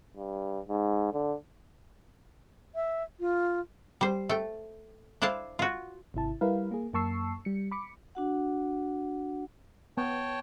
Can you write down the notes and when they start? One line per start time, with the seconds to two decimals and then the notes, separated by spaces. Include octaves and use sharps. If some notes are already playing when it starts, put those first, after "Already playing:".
0.16 G2
0.69 G#2
1.13 D3
2.75 E5
3.20 F4
4.01 G3 C5
4.29 A3 G5
5.22 D4 E4 C5 F5 A5
5.59 F4 F#4
6.14 G#1 C3 E4 A5
6.41 G3 E4 A#4 B4 F5
6.71 A#3 G#4
6.93 F#2 A#3 A5 C#6 E6 C7
7.45 G3 C#7
7.71 B5 D6 C#7
8.15 D4 F#4 F#5
9.97 B3 C#5 G5 A5